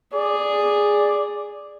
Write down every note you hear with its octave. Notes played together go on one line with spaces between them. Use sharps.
G#4 D5